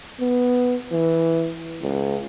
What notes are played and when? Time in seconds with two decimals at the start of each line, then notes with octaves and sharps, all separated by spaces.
0.20 B3
0.92 E3
1.82 C#2